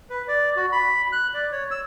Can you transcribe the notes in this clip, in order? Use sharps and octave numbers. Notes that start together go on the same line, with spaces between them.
B4
D5
F#4
B5
F#6
D5
C#5
E6